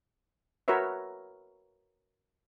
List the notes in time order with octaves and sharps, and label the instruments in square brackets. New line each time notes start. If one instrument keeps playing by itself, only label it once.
[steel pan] F#4 A#4 B4 C#5 E5